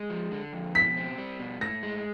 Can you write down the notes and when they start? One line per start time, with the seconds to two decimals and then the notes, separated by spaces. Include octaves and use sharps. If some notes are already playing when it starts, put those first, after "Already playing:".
Already playing: G#3
0.10 F3
0.32 D3
0.53 F2
0.75 B2 B6
0.97 C4
1.18 G3
1.40 B2
1.61 A2 A#6
1.83 G#3